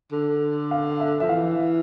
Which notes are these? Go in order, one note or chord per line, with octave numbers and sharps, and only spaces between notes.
D3
F5
E5
F3 E5
E3 F5